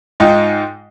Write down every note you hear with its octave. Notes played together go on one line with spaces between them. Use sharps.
G#2 D#4 F4 G5